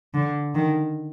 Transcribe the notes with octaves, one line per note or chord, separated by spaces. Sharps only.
D3
D#3